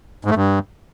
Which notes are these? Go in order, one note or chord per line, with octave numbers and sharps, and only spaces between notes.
G#2
A3
G2